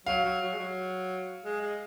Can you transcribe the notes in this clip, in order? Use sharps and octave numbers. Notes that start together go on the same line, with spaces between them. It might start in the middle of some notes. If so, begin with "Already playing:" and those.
F#3 F5
F#3
F#3
G#3
F#3
G#3
G#3